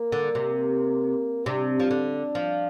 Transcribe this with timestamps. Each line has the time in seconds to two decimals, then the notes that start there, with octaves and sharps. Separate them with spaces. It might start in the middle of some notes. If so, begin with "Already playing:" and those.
Already playing: A#3
0.12 D3
0.35 C3
1.46 C3 D4
1.80 F3
1.90 D3
2.35 F3